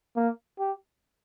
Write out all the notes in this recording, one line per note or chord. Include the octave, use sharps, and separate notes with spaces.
A#3
G4